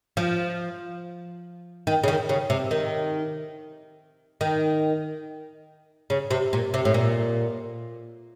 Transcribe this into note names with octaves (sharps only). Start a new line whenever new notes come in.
F3
D#3
C#3
D#3
C#3
C3
D#3
D#3
C#3
C3
A#2
C3
A2
A#2